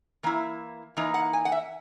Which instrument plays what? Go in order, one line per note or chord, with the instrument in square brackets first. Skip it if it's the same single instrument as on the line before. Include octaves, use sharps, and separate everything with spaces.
[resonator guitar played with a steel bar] E3 A#3 E4
E3 A#3 D#4
F#5
G#5
F#5
E5